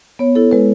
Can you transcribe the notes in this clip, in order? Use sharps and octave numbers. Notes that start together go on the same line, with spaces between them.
B3 C#5
E4 A4
G#3 B4